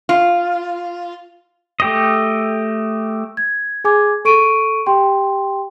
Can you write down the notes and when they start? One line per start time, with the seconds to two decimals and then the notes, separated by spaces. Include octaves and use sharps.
0.09 F4
1.80 A3 G4 D#5
3.37 G#6
3.84 G#4 G#5 D6 G#6
4.25 A4 C#6 D7 D#7
4.86 G4 G5 C6